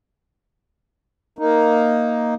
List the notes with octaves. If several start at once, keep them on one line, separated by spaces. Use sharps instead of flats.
A#3 D#4